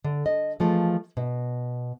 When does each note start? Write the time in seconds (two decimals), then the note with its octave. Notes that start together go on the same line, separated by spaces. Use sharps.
0.04 D3
0.26 D#5
0.60 E3 F3 G#3 A3 F4
1.17 B2